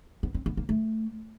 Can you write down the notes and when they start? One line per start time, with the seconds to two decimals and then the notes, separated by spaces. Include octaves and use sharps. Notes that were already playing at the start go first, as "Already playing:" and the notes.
0.23 B3
0.34 C4
0.46 B3
0.57 A#3
0.69 A3